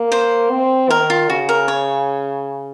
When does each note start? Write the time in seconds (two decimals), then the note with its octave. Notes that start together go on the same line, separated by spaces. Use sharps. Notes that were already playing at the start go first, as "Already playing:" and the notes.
Already playing: A#3
0.12 C5
0.51 C4
0.90 D#3 A#4
1.10 F4
1.29 C#3 F#4
1.49 A#4
1.68 C#5